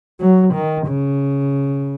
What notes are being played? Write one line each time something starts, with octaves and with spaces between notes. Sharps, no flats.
F#3
D#3
C#3